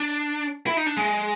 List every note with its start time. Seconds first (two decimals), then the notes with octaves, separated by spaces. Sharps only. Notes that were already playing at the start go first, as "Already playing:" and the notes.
Already playing: D4
0.67 E4
0.77 D#4
0.86 D4
0.97 G#3